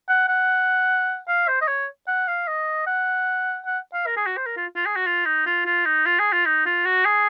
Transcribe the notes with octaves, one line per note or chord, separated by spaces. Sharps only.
F#5
F#5
F5
C5
D#5
C#5
F#5
F5
D#5
F#5
F#5
F5
A#4
G#4
F#4
C5
A#4
F4
F4
G#4
F#4
F4
D#4
F4
F4
D#4
F4
G#4
F4
D#4
F4
F#4
G#4